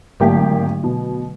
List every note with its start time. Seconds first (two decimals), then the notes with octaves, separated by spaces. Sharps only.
0.20 G#1 D3 F#3 A3 A#3 G4
0.84 B2